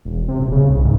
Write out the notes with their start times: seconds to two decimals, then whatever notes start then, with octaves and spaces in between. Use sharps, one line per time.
0.05 E1
0.28 C3
0.40 D#1
0.52 C#3
0.70 C2
0.84 G#2